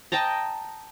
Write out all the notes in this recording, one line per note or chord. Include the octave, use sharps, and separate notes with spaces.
D#5 G5 A5 A#5